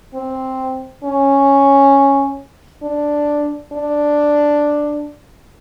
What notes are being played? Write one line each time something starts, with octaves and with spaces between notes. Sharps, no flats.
C4
C#4
D4
D4